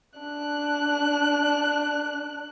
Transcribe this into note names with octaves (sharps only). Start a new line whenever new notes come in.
D4 F#6